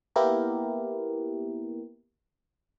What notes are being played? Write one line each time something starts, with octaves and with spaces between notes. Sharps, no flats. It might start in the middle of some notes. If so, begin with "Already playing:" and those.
A#3 B3 E4 G4 A#4